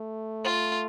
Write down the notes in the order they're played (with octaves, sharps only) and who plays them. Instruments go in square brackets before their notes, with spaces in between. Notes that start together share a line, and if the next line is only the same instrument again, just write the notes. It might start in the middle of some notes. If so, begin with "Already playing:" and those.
Already playing: [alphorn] A3
[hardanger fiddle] F4